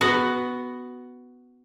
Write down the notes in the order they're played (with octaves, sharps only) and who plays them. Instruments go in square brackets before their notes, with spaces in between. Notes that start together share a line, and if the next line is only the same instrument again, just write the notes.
[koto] B3 F#4